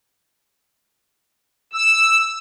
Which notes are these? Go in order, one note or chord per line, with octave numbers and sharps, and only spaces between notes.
E6